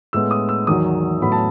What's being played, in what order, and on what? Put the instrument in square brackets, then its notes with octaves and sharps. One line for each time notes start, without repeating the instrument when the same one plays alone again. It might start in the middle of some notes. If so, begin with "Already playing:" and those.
[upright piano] A2 G#3 B3 E6
D#6
E6
E2 D#3 F#3 D#6
A2 F#3 B3 B5
A5